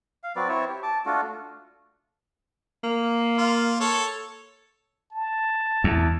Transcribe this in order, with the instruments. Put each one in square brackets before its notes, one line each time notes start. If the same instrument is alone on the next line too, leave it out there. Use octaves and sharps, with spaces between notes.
[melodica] F5
F#3 C4 B4 D5
C4 E4 C#5 E5
G4
A5 D6
A3 D4 F4 F#4
[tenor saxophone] A#3
[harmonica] F4
A4 C#5
[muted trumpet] A5
[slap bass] E2